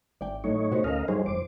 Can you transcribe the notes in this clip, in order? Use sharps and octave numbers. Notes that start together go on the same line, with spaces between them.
G#1 D5 G5
A2 F#3 A3 D#4 C#5
B2 F#4 G4 C5
D2 C#4 A4 A#4 D#5 F5
G2 F#3 D#4 G#4 C5 C#5
F1 F2 C5 D6